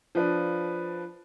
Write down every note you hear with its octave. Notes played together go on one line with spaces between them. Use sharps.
F3 D4 B4